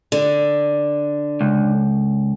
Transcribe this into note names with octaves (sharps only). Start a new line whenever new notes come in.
D3
C#2